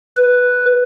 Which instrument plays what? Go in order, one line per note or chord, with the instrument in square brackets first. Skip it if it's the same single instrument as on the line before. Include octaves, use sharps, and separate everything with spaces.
[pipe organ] B4